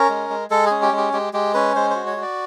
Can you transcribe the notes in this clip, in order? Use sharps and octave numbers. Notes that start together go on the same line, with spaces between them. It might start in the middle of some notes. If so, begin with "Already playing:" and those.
Already playing: C#4 A#4
G#3
G#3
G#3 A4
C#4 G#4
G4
G#3
G4
G#3 G4
G#3 G4
C#4 B4
G#3 C5
C5
F#4
C#5
F#4
D5